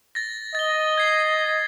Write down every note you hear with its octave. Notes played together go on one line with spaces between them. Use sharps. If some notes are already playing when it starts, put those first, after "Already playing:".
A6 A#6
D#5 A6 G7
G#6 C7